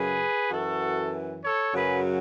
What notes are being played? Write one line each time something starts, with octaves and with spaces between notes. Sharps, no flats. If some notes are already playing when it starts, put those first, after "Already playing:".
Already playing: F#2 C#3 F#3 G#4 B4
F#2 E3 F#4 A4
A4 C#5
F#2 C#3 F#3 G#4 B4